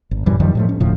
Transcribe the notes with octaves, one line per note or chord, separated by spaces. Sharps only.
G#1
F#2 A#2 E3 G3
F#2 D#3 F3 G3
A2 F3 A3
C#4
E1 D2 A2 F3